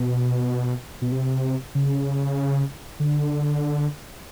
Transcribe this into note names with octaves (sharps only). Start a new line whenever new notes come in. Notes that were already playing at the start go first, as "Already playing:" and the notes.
Already playing: B2
B2
C3
C#3
D3